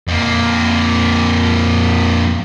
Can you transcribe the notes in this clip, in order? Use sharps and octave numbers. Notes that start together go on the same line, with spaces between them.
F2 A#3